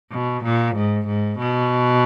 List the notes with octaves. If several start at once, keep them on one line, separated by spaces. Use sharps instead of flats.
B2
A#2
G#2
G#2
B2